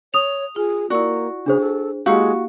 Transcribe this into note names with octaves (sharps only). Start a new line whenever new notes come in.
C#5 D#6 F7
F4 G#4
A#3 E4 F#4 D5
C#3 D4 G#4 C5
A4
G#3 A#3 E4 F#4 G4 F5